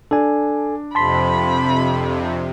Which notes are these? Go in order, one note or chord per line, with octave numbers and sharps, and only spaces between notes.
D4 A4 G#5
F2 C3 A5 B5 C6 B6